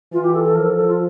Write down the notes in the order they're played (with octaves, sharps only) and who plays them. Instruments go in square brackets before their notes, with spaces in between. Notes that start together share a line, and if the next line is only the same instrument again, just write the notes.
[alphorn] E3 [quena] F4
[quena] G4
A4
A4
[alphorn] F3 [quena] A#4
[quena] A4
A4
F4